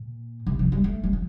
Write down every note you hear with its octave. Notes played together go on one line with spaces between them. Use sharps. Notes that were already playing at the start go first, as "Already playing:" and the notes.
Already playing: A#2
C3
F3
G3
A3
G3
F3